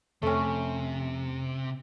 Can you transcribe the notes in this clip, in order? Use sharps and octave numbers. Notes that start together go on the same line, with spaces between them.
F2 C3 A3 C#4